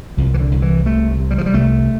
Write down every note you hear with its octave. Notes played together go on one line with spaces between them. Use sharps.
C2 F3
E3
D3
C2
E3
C3 A3
C3
G3
F3
G3
C2 A3